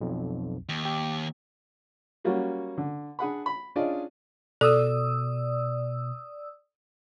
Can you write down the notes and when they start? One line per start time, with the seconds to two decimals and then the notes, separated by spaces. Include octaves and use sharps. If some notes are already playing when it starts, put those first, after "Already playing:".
0.01 B1 F2
0.69 D#2
0.85 G4
2.25 F#3 G3 A#3 C#4 F#4
2.78 D3
3.19 D4 G#4 F#5 B5
3.46 B5
3.76 C#4 D4 F4 G#4 D5 D#5
4.61 B2 A4 D5 D#6 E6